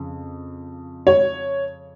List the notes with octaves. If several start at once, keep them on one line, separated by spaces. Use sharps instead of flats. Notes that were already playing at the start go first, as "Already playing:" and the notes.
Already playing: F2 C#3
C#5